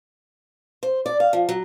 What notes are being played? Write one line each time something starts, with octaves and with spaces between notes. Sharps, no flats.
C5
D5
F5
F3
F#3